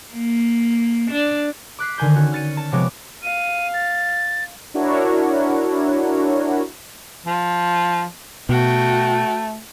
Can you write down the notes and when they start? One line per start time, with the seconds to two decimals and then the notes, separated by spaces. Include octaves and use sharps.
0.13 A#3
1.11 D4
1.79 D6 F#6 B6 C7
1.98 D3 D#3 G#5 G6
2.16 C#4 F#4
2.32 F6 A6 C#7 D#7
2.57 A5
2.72 C3 F3 G#3 B3 C#5 D6
3.23 F5 D#7
3.74 A6
4.74 D4 E4 F#4 A#4 C#5
7.26 F3
8.49 B2 A3 F#4 G5